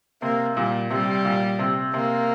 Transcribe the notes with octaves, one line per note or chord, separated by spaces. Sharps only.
C3 A#3
A#2 G3
C3 G3
A#2
C3
C3 A#3